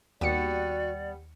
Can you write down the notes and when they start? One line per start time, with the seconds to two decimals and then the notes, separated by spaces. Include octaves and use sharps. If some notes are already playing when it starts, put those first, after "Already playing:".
0.21 D#2 G3 B3 F#4 D5 C#7